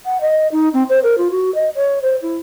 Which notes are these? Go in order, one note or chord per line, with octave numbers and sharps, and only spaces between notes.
F#5
D#5
D#4
C4
C5
A#4
F4
F#4
D#5
C#5
C5
E4